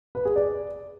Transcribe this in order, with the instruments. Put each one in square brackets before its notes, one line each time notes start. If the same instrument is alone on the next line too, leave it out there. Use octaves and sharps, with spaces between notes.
[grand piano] B4
G#4
D5